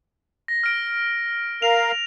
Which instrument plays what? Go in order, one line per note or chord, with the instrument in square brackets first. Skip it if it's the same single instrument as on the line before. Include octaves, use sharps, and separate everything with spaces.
[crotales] A#6
F6 D7
[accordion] A#4 F5 [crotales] F7